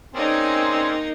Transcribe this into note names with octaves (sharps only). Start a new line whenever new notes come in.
A#3 C4 C#4 D#4 G#4 D5